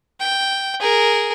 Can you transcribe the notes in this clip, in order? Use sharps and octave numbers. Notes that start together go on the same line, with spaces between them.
G5
G#4 A#4